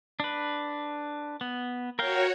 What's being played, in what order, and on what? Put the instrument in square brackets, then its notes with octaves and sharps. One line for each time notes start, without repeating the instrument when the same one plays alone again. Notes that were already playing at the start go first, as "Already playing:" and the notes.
[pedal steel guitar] D4 B4
B3
[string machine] F#4 C#5 [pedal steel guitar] A#4 F5 G5